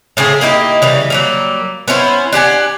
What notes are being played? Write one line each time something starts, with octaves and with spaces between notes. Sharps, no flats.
A2 C#3 C4 G#4
A#3 D#4 E4 G4
C#3 E3 G3
F#3 G3 A#3
B3 C#4 E4 C5
D4 G4 F#5 G#5